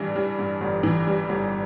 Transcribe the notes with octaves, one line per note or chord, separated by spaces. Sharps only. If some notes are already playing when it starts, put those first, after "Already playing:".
Already playing: G2 E3 G3
G3
G2
G1
E3
G3
G1